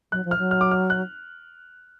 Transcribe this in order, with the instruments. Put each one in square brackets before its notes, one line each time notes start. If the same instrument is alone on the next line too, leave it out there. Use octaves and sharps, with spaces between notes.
[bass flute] F#3 [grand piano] F#6
[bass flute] F3
[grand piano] F6
[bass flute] F#3
[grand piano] F6
D6
F6
F#6